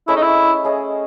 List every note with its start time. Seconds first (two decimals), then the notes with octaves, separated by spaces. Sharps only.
0.08 A3 C#4 E4 G#4 D#5
0.15 D#4
0.22 E4
0.64 A3 C#4 G#4 D#5